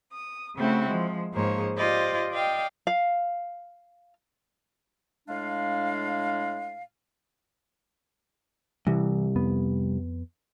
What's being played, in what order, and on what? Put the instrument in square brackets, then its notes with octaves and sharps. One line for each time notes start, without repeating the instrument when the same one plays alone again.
[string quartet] D#6
C#3 A3 C4 E4 F#4
F3 G#3
G#2 F3 A#3 G#4 C5 C#5
F4 G4 C5 D5 D#5
D5 D#5 F5 G5
[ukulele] F5
[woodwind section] A2 G#3 D4 F5
[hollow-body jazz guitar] C2 [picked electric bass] E3
[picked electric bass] F2 B3